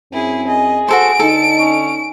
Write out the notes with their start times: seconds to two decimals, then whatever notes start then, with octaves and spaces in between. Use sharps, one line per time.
0.13 F#2 C4 E4 G#4
0.48 G#4 D#5
0.89 F#4 A4 C5 D7
1.20 D3 D#4 A4
1.59 C#4